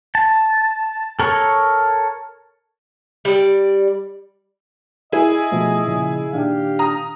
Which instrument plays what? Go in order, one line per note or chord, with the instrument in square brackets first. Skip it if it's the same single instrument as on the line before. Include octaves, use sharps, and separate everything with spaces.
[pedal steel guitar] A5
A4 A#4 C#5
[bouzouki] G3 D5
[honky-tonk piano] E4 G#4 [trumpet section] D#5
[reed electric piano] B2 F3 A3
A#2 C#3 F3
[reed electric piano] A#2 D#3 D4 [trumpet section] G4 F5
[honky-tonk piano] A#5 D#6